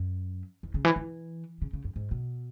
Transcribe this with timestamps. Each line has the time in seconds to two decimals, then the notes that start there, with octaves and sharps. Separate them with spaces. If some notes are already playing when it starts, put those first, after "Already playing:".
Already playing: F#2
0.63 E2
0.74 C#3
0.85 E3
0.96 E3
1.62 C#3
1.73 C#3
1.85 F#2
1.96 G#2
2.11 B2